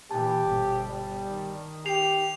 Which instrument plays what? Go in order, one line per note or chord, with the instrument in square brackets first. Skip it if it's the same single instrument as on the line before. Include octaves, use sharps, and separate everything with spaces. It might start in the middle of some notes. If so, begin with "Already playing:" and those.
[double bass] A#2 E3 [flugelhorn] G4 [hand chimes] A5
[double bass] G1 B2
[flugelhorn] G3
[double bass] D#3
[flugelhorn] G4 [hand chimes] C7 [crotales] F7